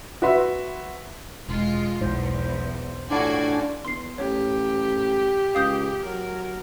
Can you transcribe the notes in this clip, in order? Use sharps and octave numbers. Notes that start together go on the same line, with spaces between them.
F#4 B4 E5 C6
E1 G#3 F4
B1 E2 G#2 C5
A2 D4 F4 F#4 D5 G#5
E2 C6 C7
A1 G4 C#5
C#2 F5 D#6 G6
F#3 A#4